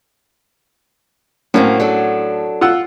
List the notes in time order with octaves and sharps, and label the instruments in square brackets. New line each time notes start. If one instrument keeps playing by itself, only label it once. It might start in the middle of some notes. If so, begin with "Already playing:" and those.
[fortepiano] A2 C#4 [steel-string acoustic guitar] F#3 A#3 C4
[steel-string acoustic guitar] F#3 D4 A4
[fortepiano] F4 F#5 E6